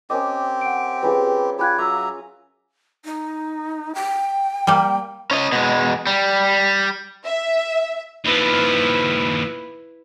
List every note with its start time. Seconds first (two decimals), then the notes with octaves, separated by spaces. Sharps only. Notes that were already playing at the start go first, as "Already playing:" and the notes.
0.10 C4 C#4 G4 A#4 D#5 D6
0.61 F#5 D7
1.03 G3 C#4 F4 G#4 B4
1.59 F4 G4 G#4 B5 F#6 G#6
1.78 F#3 B4 E5 A#5 D6 E6
3.05 D#4
3.95 G5
4.67 G3 A#3
5.31 C#4 D#5
5.52 B2 G#3
6.07 G3
7.24 E5
8.24 D#2 F3 E4 B4